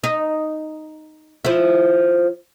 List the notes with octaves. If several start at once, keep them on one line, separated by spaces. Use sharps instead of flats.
D#4
F3 E4